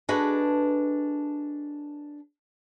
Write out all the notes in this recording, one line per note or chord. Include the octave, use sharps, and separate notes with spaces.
D4 F#4 G#4 A4 B4 D#5